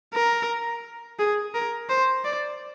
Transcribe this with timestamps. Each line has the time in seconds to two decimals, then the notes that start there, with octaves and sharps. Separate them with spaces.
0.14 A#4
1.19 G#4
1.54 A#4
1.89 C5
2.25 D5